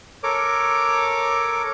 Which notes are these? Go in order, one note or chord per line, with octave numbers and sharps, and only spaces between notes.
A4 A#4 C#5 D6